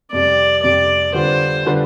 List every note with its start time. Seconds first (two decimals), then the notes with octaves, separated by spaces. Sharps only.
0.12 F2 C3 G3 D5
0.63 F2 C3 G3 D5
1.14 D3 G3 D4 F4 B4 C5
1.66 D3 G3 D4 F4 B4